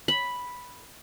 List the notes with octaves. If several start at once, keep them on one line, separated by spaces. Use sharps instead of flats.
B5